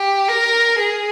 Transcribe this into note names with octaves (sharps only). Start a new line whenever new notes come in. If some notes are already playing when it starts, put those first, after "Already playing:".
Already playing: G4
A#4
G#4